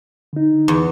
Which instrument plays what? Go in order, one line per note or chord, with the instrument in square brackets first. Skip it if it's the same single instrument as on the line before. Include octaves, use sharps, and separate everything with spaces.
[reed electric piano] D3 D#4
[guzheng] E2